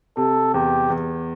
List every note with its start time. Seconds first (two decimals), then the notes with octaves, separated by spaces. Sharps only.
0.17 C3 A4
0.54 E2 G4
0.90 E2